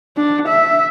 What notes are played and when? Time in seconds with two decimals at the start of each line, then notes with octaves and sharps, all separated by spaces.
0.17 D4
0.48 E5